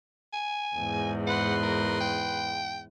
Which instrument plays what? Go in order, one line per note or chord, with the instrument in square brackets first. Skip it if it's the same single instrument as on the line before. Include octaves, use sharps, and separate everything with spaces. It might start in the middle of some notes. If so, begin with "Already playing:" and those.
[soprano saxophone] G#5
[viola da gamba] E2 G#2
[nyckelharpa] B4 C6 [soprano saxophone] F#5
[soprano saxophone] A#4
G5